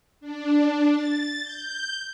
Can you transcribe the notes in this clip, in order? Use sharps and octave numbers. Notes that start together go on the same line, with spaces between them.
D4
A6
G6